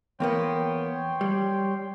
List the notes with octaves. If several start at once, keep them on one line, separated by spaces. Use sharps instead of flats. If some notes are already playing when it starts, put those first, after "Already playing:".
E2 A#3 B3 C#5 G5 C6
G3